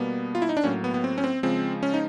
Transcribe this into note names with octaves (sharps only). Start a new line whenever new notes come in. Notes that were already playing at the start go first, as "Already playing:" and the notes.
Already playing: B2 G3 A#3 B3
F4
E4
D#4
D4
A2 F#3 A#3 C#4
B3
B3
C4
C#4
C4
C#3 F3 G#3 C4
C#4
D#4